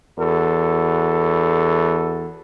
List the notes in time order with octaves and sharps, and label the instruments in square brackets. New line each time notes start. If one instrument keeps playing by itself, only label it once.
[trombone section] E2 F#4 A4